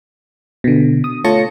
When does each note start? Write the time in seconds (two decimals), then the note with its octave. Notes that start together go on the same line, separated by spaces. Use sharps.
0.64 B2 D3
1.04 D#6
1.24 A3 F4 C#5 A5 A#6 C#7